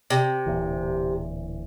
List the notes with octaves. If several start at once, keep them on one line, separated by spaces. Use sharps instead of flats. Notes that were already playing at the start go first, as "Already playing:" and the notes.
C3
D1 A#2 E3